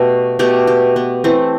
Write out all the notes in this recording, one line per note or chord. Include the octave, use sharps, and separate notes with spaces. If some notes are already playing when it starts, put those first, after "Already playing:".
Already playing: B2 A3 G4
B2 A3 G4
G4
B3
E3 A3 C4